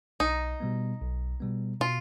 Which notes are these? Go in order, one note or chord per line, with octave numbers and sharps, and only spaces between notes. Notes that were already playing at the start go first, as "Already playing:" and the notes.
B1 D#4
B2 G3 B3
B1
B2 G3 B3
B2 F4